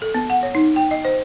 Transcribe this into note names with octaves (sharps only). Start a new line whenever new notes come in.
A4
B3
F#5
C#5
D#4
G5
D#5
C5